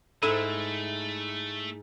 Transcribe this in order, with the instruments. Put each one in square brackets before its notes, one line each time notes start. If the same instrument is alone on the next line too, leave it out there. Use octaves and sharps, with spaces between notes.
[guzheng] G#2 E4 [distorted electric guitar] A3 [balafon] A4